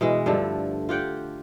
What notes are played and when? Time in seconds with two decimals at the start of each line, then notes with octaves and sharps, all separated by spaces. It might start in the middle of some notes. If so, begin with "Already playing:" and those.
0.01 B2 E3 G#3
0.26 G2 D3 F3 A3
0.89 F4 G4 F#5 G5